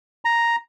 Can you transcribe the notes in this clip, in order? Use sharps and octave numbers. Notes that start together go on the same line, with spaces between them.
A#5